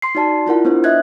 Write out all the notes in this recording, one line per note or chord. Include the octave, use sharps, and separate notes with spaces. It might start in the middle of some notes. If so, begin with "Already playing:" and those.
C6 C7
D#4 F#4 D5 A5
E4 F4 A#4 F#5
B3 D4 C5
D#5 E5 F#6 G#6